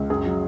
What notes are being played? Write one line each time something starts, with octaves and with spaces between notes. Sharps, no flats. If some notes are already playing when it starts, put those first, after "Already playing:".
Already playing: C#2
F#2 G#4
F#3